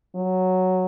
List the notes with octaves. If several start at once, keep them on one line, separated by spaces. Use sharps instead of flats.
F#3